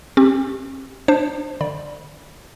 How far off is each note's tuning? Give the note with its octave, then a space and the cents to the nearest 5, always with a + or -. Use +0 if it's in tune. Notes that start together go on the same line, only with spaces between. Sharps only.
C4 +40 G4 +0
D4 +15 C5 +0
D3 +40 D5 -5 B5 -25